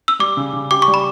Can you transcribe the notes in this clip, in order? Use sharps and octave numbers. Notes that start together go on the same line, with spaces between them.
E6
G3 D6
C#3
C#3
G4 D6
C#6
G3
B5